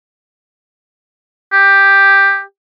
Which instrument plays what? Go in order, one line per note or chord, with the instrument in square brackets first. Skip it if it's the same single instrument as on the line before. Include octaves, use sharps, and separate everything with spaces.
[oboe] G4